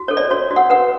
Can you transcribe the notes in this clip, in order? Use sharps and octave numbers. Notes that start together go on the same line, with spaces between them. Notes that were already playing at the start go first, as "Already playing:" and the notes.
Already playing: F#4
A4 C#5
D5
F#4 C#5
F#4
F#5
B4 F#5